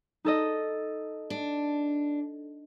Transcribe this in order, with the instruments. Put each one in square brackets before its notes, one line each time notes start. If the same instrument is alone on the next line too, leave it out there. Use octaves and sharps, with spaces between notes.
[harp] D#4 A4 D#5
[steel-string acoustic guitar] D4